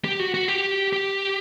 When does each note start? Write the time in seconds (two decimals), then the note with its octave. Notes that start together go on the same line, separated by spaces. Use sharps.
0.04 G4
0.19 F#4
0.34 F#4
0.48 G4
0.93 G4